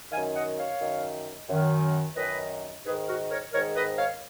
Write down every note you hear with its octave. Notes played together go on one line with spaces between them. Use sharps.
F#2 D#3 F5 G#5
D#5 F#5
C#5 F5
F#2 D#3
F#2 D#3
F#2 D#3 B4 D#5
G#2 D#3 G#4 B4
F#4 A#4
A#4 C#5
G#2 D#3 A#4 C#5
B4 D#5
C#5 F5